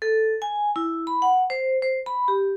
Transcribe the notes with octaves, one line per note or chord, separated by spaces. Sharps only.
A4
G#5
E4
B5
F#5
C5
C5
B5
G4